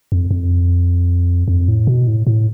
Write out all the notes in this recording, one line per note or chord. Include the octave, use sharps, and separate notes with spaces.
F2
F2
F2
A2
B2
A2
A2